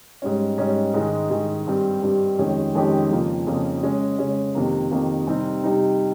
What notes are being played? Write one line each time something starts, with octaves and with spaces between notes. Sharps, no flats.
G#2 G3 C#4
G#2 G3 C#4
G#2 D#3 G#3 D#4 G#4
G#2 D#3 G#3 D#4 G#4
G2 G3 C4 G4
G2 G3 C4 G4
F2 D#3 G#3 C#4 G4
F2 D#3 G#3 C#4 G4
F2 C#3 F3 A#3
F2 C#3 F3 A#3
C#3 G#3 C#4
C#3 G#3 C#4
F2 C3 D#3 A#3
F2 C3 D#3 A#3
C3 G3 C4 D#4
C3 G3 C4 D#4